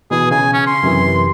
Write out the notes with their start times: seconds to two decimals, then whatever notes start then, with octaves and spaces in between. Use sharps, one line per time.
0.11 B2 E3 G#4
0.31 C#3 G#5
0.53 C#4
0.67 C6
0.83 F#2 C3 E3